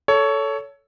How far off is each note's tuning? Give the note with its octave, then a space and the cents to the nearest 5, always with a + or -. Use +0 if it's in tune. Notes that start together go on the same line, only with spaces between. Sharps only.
A4 +0 C#5 +15